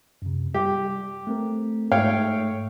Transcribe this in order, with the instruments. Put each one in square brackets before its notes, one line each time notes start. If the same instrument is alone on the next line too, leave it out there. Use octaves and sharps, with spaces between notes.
[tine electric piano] F#2 C3
[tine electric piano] G3 [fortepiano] G4
[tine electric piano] A3 C4 A#4
[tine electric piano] G#2 A3 E5 [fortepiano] C#5 F5 G5